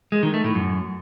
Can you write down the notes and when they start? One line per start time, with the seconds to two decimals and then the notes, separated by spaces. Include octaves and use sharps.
0.12 G#3
0.23 D#3
0.34 A3
0.44 A2
0.55 F#2